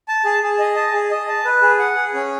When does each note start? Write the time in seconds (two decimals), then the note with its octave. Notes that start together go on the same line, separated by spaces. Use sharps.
0.08 A5
0.25 G#4
0.42 G#4
0.59 D#5
0.76 A5
0.93 G#4
1.11 D#5
1.28 A5
1.45 B4
1.62 G#4
1.79 F#5
1.96 G#4
2.14 C#4